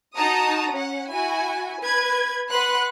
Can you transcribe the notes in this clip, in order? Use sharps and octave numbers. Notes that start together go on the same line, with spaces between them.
D#4 F#4 A5 A#5 D#6
C#4 F#5
E4 F#4 G#5
B4 G#6
B4 F#5 C6 F#6